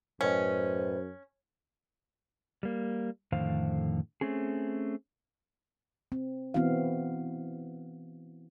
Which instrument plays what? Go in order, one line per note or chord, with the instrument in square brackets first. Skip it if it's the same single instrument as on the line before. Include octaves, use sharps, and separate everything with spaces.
[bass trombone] F#2 [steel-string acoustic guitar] A2 B4 D#5 [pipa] C#4 [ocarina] C5
[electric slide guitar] G3 A#3
F2 A2 D3 D#3 C5 F5
A3 C4 C#4 G#4
[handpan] C4
E3 B3 C4 E4 F#4 F5